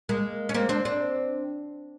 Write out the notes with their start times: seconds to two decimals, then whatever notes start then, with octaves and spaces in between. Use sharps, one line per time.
0.09 G#3 A#3
0.49 C#4
0.54 A#3 C4
0.69 C4 D4
0.85 C4 D4